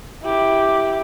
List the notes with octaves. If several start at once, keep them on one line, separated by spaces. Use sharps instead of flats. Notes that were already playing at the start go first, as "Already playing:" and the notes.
E4 G4